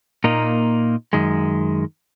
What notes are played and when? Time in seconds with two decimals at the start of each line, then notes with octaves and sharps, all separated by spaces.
0.24 A#2 A#3 D#4
1.13 F#2 D#3 G#3